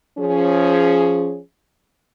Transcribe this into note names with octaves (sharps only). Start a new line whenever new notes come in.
F3 C#4 G#4